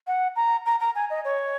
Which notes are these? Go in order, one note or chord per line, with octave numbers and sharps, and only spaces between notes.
F#5
A#5
A#5
A#5
G#5
D#5
C#5